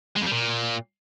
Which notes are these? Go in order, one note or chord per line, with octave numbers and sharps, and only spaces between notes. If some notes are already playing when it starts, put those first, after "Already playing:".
G#3
F2
G3
A#2